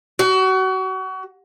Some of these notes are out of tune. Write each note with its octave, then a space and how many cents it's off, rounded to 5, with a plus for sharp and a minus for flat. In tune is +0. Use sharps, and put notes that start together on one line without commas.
F#4 +30